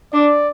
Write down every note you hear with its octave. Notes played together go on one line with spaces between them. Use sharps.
D4 D5